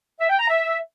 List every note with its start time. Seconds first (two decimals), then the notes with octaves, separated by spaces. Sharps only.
0.20 E5
0.30 G5
0.39 A#5
0.49 E5